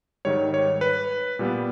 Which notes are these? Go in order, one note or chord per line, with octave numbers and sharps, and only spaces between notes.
G#2 D#3 G3 C#5
C#5
B4
A#2 G3 B3